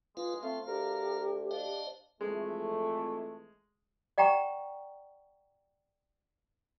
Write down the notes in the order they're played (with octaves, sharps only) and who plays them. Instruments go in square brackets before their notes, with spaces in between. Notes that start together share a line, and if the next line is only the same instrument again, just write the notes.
[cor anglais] G#3 [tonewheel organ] F4 B4 F5
[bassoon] A3 [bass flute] C4 [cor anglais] F4 [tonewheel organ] F5
[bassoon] D2 [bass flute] G4 [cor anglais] A#4
[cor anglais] D4 [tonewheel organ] C5 D#5 F5
[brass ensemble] F2 E3 A3 [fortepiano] G#3
[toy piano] D5 F#5 G5 A#5 C#6